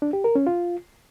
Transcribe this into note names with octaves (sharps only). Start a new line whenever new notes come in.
D4
G4
A#4
C#4
F4